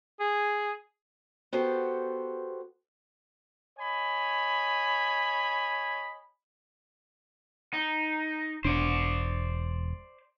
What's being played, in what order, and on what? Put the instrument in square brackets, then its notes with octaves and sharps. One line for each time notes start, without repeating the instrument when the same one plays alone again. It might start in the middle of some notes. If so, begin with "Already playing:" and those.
[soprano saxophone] G#4
[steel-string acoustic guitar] B3 F#4 G4 A4 C5
[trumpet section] C#5 D#5 G#5 B5
[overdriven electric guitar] D#4
[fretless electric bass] E1 D4 [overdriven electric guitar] C5 D5